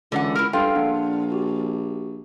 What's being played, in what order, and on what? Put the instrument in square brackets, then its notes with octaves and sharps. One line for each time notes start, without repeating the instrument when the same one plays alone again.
[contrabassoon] C#2 [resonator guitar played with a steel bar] D3 E3 F#5
[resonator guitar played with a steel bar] E4 A#4 [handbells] F6
[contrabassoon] G2 [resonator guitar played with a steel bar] F4 [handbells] A4 F5 G5
[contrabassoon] A#1 [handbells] D4 F#5
[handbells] F#4 G4